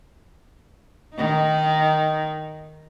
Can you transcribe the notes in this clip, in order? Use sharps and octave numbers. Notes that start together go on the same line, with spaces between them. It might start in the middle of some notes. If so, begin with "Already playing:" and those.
D#3 D#4